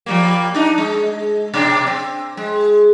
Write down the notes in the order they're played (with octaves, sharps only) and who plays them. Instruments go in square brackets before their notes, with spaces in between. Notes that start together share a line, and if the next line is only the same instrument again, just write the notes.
[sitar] F3 G3 A#3
D4 D#4
G#3
B2 C4 D4
C4
G#3